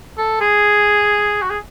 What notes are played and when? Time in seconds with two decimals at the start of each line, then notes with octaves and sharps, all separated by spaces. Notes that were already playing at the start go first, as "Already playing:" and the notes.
0.17 A4
0.41 G#4
1.42 F#4
1.50 G#4